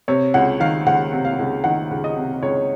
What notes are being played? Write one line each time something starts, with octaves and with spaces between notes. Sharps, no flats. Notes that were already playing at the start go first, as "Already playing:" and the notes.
C3 C#5
C#2 F#5
D#3 F5
C#2 F#5
C3
F5
C#2
D#3 F#5
C#2
D#5
C3
C#2 C#5